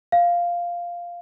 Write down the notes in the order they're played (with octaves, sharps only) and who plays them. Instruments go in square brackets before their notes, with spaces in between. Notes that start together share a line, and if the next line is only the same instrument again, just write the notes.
[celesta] F5